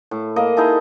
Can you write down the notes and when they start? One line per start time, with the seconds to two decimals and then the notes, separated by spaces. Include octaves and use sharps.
0.11 A2
0.36 A#3 D#5
0.57 D#4 E4 G#4 A4